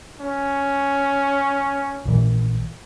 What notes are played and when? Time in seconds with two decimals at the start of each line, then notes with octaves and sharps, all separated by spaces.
0.20 C#4
2.05 A#1 A#2 E3